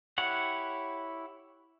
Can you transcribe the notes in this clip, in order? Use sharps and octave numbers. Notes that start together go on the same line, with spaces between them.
E4 G4 C#5 F#5